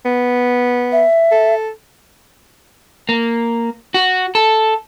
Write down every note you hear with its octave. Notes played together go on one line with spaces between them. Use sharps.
B3
E5
A4
A#3
F#4
A4